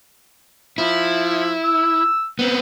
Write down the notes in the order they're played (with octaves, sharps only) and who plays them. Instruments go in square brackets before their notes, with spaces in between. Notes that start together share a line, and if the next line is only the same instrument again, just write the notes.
[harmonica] F3 [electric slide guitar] E4
[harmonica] E6
[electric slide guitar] B3 C4